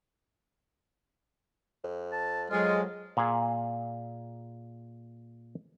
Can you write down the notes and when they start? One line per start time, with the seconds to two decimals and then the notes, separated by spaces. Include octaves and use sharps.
1.84 F2
2.12 A5
2.51 F2 F#3 G#3 F4
3.17 A#2 G#4